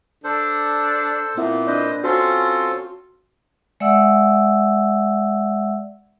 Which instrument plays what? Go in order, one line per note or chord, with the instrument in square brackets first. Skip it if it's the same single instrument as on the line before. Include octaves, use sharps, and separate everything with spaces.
[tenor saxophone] D4 [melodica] A4 C5
[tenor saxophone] A#2 [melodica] B3 [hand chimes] C4 E4 E5
[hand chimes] D4 D5 [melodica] B4 C5 D#5
[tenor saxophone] C4 [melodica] C#4 F4 A4 [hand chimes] F#4
[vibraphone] G#3 D5 E5 F#5 E6